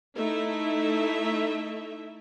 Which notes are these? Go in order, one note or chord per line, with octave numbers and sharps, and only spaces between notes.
A3 D#4 E4 E5